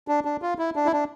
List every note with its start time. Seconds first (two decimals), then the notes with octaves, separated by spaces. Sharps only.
0.08 D4
0.25 D4
0.42 F4
0.58 E4
0.76 D4
0.86 E4
0.93 D4